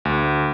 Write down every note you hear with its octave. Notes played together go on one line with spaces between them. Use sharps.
D2